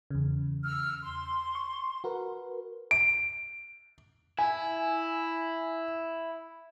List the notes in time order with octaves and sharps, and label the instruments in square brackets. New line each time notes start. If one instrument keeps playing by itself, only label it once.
[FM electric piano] E2 C#3
[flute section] E6 F6
C6
[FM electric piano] C#6
F#4 A#4 B4
[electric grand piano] D7
[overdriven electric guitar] E4 [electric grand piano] G#5